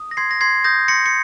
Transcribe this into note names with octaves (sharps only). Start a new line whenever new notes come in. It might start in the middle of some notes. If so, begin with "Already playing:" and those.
Already playing: D#6
A#6
C6 G#6 C7
A#6
C6 G#6 C7
D#6 G6 A#6
C6 A#6 C#7
C#7